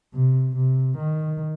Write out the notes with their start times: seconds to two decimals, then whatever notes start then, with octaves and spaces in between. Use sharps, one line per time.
0.14 C3
0.56 C3
0.98 D#3